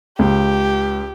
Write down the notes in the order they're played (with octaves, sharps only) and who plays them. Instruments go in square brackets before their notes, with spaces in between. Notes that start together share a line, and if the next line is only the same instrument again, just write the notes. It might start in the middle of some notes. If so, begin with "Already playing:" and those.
[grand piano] C#2 [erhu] G4